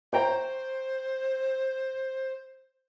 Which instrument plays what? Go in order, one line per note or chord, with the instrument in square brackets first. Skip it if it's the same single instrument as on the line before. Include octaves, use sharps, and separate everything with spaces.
[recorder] C5 [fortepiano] C#5 G5 A#5